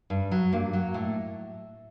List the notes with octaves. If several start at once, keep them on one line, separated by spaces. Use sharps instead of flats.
G2
F#3
G2 A#3
F#3
A2